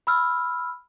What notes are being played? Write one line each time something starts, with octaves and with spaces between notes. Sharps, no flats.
B5 E6 F6